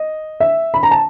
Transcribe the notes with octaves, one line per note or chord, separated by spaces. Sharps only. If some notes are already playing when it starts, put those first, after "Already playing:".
Already playing: D#5
E5
B5
A#5
A5